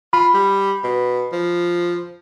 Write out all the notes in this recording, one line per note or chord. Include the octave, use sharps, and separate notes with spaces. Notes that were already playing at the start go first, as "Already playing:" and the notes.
F4 B5
G3
B2
F3